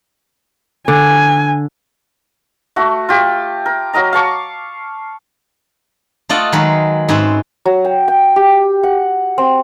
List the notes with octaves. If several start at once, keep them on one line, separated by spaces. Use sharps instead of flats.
D3 G#5
A3 F#4
F4 G4
A#4
F#3 A#4 D#5 A#5
F5 A5 C#6 D6
A3 F4 D5 D#5 F#5
D#3 F#3 G#3 F#4 A#4 B4
G#2 C4 C#4 B4 E5
F#3
G5
G5
G4
F#5
C4